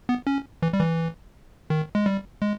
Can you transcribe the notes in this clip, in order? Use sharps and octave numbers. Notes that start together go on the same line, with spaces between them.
B3
C#4
E3
G3
E3
D#3
G#3
G3
G#3